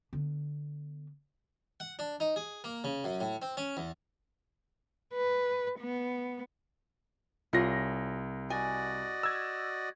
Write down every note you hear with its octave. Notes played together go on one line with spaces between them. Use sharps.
D3 B3
F#5
D4
D#4
G#4
A#3
C#3
F#2
A2
C4
C#4
E2
B4
B3
C2 F4 G#4 C#5 A#6
F#4 D5 D#5 G#5
E6 G#6